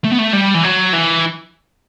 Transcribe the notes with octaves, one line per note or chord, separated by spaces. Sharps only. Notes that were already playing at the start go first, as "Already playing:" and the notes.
A3
B3
A3
G3
E3
F#3
E3